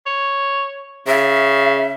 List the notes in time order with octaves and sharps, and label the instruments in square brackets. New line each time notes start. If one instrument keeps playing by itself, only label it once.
[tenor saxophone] C#5
[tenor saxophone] C#3 [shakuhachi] E5